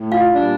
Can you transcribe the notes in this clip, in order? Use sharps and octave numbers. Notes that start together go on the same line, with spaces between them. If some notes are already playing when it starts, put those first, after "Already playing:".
Already playing: A2
F4 F5
A#2 G3 D4